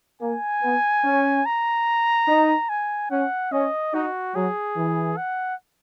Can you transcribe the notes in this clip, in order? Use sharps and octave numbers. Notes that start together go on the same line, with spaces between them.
A#3 G#5
B3
C#4
A#5
D#4
G#5
C#4 F#5
C#4 D#5
D#4 F#4
F#3 G#4
E3
F#5